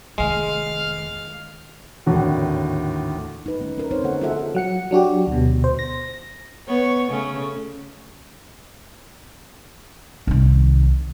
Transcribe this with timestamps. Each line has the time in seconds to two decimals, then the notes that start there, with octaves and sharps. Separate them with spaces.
0.18 F1 D#3 G#3 F5
2.06 G#1 D#2 A2 D3 F#4
3.46 D#4 B4
3.60 D#3 A3 C#4
3.78 C#4 A#4
3.91 C4 D#4 C5 C#5
4.03 D3 A#3 A4 F#5
4.22 F4 F#4 G#4 A4 E5 F#5
4.55 F#3 F#5 C#7
4.91 F#3 D4 F#4 G4
5.28 D2 B2
5.64 C5
5.79 A#6
6.67 B3 C#5
7.10 C#3 A3 C#4
10.27 C2 D#3